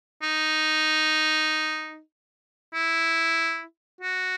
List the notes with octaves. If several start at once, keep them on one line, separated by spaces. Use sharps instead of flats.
D#4
E4
F#4